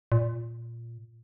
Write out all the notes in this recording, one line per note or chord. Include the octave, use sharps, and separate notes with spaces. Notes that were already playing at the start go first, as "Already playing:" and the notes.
A#2